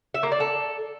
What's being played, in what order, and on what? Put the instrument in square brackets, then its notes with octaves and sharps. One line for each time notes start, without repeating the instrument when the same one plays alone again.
[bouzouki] E5
A#3
D5
A4